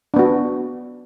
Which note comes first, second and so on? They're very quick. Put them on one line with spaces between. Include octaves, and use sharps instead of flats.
D4 B3 F#4